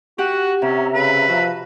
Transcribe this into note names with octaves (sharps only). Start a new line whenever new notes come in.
F#4 G4 F#5
C3 C#4 E5 A#5
C#3 B4
F3 F#4